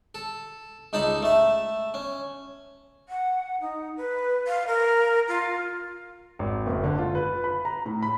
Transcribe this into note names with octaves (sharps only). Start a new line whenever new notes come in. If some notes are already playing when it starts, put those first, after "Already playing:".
A4
C#2 D#4 A4 A5 B5
A3 E5
C#4
F#5
D#4
B4
F5
A#4
F4
G#1
F#1
D3
F4
B4
B5
A#5
A2
B5